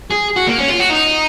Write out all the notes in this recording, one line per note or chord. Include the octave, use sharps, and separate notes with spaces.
G#4
F#4
A#3
C#4
F4
F#4
D#4